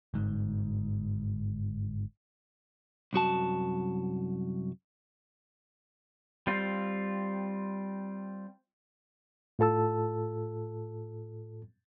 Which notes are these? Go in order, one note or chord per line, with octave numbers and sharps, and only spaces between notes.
G1 G#2
C2 F#2 F#4 A5
G3 C4 F4
A2 F4 A4 A5 E6